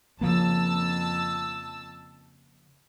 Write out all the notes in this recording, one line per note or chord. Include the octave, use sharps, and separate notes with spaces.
F2 C#3 F3 A#3 A5 E6